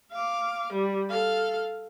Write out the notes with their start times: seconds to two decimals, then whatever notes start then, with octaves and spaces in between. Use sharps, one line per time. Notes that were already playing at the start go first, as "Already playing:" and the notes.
0.12 F5 D6
0.73 G3
1.10 A4 F5